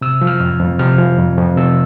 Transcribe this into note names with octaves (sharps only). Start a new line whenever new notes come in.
C3 E6
F3
F6
F2
F2
C3 F6
F3
F2
F2
C3 E6